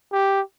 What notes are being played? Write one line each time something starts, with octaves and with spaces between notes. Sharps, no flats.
G4